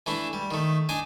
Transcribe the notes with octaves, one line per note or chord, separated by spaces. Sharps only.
E3 A3 D4 E4
G3
D#3 A3
D4 D#4 D5 G#5